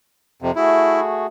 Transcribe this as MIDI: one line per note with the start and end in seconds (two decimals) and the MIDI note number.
0.42 0.51 41
0.42 0.51 48
0.55 1.27 57
0.55 1.00 64
0.55 1.27 66
0.55 1.27 68